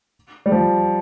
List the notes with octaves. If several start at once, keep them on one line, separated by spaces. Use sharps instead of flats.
G3
F3